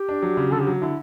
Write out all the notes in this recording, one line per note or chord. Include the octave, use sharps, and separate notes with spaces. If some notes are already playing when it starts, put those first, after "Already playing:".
Already playing: G4
D4
F#3
C#3
D3 A4
G4
F#3
D3 E4